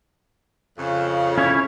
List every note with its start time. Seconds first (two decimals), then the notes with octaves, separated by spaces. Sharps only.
0.78 F2 C#3
1.38 C#4 E4 C#5